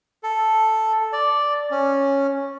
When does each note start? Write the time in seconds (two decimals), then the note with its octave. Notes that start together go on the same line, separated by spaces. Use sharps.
0.23 A4
1.13 D5
1.71 C#4